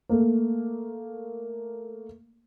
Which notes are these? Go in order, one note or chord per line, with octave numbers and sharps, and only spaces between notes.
A3 A#3